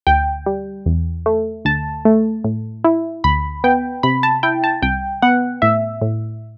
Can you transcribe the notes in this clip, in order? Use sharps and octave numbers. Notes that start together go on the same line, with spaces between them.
D2 G5
G3
E2
A3
D2 A5
A3
A2
E4
D2 B5
B3 G5
C3 B5
A5
E4 G5
A5
C2 G5
B3 F#5
A2 E5
A2